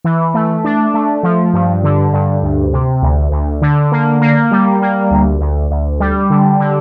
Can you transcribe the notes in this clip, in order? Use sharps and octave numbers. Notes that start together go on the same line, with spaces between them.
E3
A3
D4
A3
F3
G2
D3
G2
D2
C3
D2
D2
D3
A#3
A#3
G3
A#3
D2
D2
D2
G3
D3
D3